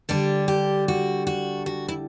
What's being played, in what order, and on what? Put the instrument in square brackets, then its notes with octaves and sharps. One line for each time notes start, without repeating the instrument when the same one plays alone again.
[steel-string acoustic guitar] D3 G3 D4 G4
G4
F#4
F#4
F#4
E4